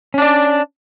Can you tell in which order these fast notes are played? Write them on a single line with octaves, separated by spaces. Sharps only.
C#4 D4 D5